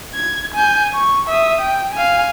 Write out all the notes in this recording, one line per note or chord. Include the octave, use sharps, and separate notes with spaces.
G#6
G#5 G6
C#6
E5 D#6
G5
F5 G#5